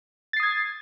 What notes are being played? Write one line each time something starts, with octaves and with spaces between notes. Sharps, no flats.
D#6 G#6 A6 C7